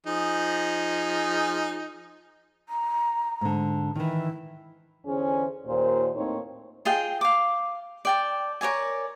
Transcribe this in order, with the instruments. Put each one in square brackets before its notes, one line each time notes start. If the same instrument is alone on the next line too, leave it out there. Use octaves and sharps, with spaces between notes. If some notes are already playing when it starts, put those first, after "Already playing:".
[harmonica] F3 D#4 G#4
[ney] A#5
[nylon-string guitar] G#2 D3
[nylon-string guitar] D#3 E3 [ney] E4
[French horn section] E2 D3 E3 C#4 G#4 C5
D#2 A#2 C5
A2 A#3 C4 D#4 C#5
[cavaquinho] F4 G#4 D#5 G5
F5 D6
D5 G5 A5
A#4 C#5 D5 G#5